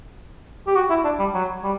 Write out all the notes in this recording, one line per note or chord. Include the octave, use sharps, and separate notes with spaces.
G4
F#4
E4
D4
G3
F#3
G3